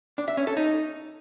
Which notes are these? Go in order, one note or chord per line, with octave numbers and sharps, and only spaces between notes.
D4
E5
C#4
A4
D#4